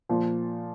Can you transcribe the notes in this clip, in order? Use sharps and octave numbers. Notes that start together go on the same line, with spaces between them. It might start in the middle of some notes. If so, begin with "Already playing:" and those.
A#2 F3